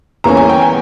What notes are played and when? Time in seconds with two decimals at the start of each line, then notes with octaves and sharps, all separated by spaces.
0.24 E2 E3 A#3 C#4 A#5
0.37 G#5
0.49 G5
0.62 G#5